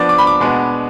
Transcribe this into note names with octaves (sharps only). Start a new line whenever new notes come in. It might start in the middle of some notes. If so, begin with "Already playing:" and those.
Already playing: F3 B3 D4 D5
D6
B5
D6
B2 G#3 B3 D4